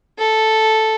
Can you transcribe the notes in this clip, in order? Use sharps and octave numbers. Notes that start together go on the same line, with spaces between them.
A4